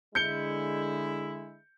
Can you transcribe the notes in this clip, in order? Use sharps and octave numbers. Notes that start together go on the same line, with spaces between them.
D3 G#3 E4 G6 C#7 G7